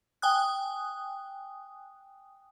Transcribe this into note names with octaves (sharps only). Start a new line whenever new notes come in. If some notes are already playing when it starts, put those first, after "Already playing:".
G5 G#5 D#6 F#6